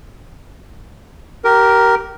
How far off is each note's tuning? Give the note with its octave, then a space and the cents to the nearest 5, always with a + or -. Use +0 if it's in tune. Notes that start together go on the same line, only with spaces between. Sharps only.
G4 -25 A#4 +0